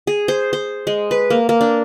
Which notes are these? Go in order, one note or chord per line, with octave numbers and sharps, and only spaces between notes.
G#4
C5
C5
G#3
B4
A#3
A#3
D4